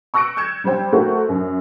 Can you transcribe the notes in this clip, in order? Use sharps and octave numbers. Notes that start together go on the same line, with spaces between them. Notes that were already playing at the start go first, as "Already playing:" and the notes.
C#6 E6 F#6 A#6 C#7 D7
G6 G#6 C#7 E7
G3 C4 C5 G5
A3 F#4 A#4 C5
F#2